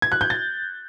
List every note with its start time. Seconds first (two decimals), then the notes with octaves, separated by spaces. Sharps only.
0.02 G#6
0.12 F#6
0.21 G6
0.30 A6